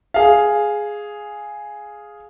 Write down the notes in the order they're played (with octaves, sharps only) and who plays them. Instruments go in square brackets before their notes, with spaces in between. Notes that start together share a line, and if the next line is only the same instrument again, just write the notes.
[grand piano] G#4 F5